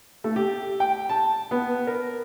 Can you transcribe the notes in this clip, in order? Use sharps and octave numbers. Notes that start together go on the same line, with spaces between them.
A3
G4
G5
A5
B3
A#4